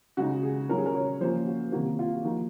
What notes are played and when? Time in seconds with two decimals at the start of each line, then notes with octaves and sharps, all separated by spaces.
0.17 C#3 G#3 D#4 F#4
0.43 G#4
0.69 C#3 F#3 C#4 A#4
0.78 G#4
0.86 A#4
0.95 C#5
1.20 F3 A#3 C#4 C5
1.46 F#4
1.72 C3 D#3 F#3 A#3 F#4
1.99 F4
2.24 F3 A#3 D#4 F#4